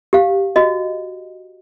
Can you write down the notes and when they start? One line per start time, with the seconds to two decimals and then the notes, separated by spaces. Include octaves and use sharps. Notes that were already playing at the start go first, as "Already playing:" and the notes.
0.13 G4 F5
0.56 F#4 D#5